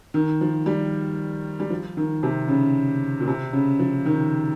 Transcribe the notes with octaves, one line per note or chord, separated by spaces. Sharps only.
D#3
F3
G3
G3
F3
D#3
C3
C#3
A#2
C3
C#3
F3
D#3